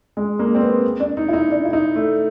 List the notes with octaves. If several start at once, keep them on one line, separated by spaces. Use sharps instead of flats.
G#3
A#3
C4
B3
D4
D#4
E4
D#4
D4
E4
D#4
A3